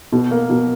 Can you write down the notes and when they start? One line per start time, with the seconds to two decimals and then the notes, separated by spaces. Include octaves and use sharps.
0.12 B2
0.31 A#3
0.50 B2